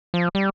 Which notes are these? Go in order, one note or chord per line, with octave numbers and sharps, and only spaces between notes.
F3
G3